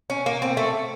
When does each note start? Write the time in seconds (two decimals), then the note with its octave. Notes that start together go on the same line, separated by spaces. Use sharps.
0.10 C#4
0.26 A#3
0.42 C4
0.57 A3